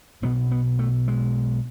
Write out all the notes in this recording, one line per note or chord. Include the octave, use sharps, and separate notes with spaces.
B1 B2 B3
B3
A3
G#3